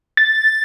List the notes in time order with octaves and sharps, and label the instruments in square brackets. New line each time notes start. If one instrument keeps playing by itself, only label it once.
[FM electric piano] A6